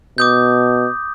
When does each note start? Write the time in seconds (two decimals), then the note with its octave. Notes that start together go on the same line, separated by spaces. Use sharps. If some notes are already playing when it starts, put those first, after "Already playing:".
0.18 B2 D6 D#6 G6